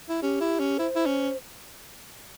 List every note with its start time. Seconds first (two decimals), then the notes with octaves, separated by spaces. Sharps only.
0.09 E4
0.22 C#4 G4
0.41 E4
0.60 C#4
0.78 E4 C5
0.96 E4
1.06 C#4